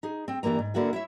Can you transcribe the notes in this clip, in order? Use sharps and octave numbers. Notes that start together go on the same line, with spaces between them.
D#4 G#4
C4 G5
G2 E3 G3 A#3 A#5
G#2
D3 A#3 E4 F#4 G#4
E4 C#5 E5